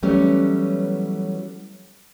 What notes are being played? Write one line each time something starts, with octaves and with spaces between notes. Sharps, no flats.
E3 F#3 G3 A3 B3 C#4